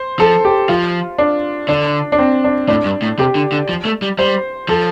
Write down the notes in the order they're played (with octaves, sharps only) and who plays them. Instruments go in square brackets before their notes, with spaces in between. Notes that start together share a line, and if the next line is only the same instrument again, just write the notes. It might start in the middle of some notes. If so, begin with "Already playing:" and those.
Already playing: [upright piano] C5
[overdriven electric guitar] F3 [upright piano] A4
[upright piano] G4
[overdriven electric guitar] F3 [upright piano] F4
[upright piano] D4
[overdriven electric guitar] D3 [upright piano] D4
[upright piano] D4
C4
D4
[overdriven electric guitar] A2 [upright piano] D4
[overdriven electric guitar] G2
A2
[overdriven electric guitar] C3 [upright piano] G4
[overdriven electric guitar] D3
D3
F3
A3
G3
[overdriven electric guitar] G3 [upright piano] C5
[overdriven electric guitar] F3 [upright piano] A4